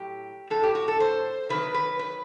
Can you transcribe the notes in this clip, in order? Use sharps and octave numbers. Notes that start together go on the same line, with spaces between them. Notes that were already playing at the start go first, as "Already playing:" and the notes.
Already playing: A2 F#3 G4
A2 F#3 A4
G4
F#4
A4
C5
C3 D#3 F#3 B4
B4
B4